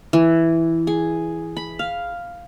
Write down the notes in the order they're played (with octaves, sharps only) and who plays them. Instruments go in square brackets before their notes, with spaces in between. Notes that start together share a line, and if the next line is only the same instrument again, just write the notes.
[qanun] E3
G#4
B5
F5